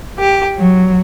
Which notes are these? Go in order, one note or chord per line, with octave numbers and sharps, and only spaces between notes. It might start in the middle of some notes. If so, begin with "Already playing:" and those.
G4
F#3